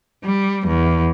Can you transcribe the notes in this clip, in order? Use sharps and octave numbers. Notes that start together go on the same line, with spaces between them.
G3
E2